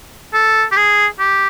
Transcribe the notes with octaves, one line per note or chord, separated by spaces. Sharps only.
A4
G4
G#4
G4